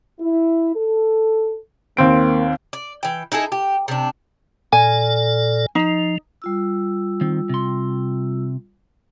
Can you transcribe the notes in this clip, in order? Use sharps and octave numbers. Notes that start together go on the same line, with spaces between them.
E4
A4
D#2 A#3 C4 D7
D5
E3 G5
D#4 E4 G#4 A4
G4
C3 D4
A#2 A4 D5 G#5
F3 D#4
G3 F4 E6
D#3 C4
C3 C6